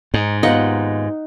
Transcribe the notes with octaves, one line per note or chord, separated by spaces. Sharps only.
G#2 D#4
D#2 B3 D#4 F4 D#5 F#5